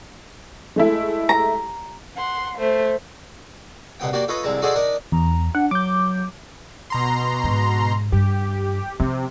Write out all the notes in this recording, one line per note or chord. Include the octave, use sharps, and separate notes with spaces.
G#3 A3 E4
A#5
F#5 C6
A3 C5
C2 B2 B3 G5
A#3 F#4 G4 D5 G5
F4 A4 B4 C#5 D#5
C2 D3 G#3 A5 A#5
D#4 F#4 G#4 A4 C5 D5
D4 D#4 A#4
E2 A#5
D4 F#5
F#3 D6 G6
B2 A#5 C6
G#2 D3
G2 G4
C3 F3 C4